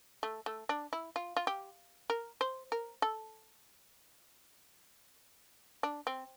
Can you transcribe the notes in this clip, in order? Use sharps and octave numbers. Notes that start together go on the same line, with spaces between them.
A3
A3
D4
E4
F4
F4
G4
A#4
C5
A#4
A4
D4
C4